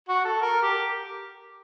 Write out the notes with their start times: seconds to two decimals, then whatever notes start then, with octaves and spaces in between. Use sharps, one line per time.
0.08 F#4
0.25 A4
0.41 A#4
0.62 G4